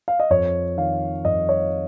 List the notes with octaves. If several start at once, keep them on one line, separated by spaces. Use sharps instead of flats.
F5
D#5
F2 C#5
D#3 F5
F2 D#5
C#5